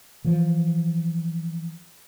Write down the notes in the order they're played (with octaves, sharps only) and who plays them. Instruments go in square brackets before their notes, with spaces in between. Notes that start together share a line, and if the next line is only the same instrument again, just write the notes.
[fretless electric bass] E3 F3